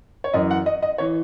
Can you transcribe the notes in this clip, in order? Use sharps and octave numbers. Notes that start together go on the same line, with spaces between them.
C#5
F#2 E3 D#5
F#5
D#5
D#5
E3 C#5